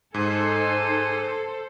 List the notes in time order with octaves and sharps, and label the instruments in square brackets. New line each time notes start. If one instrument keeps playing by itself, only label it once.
[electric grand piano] G#2 [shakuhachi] D#4 [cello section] A4 C5 [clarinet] G#5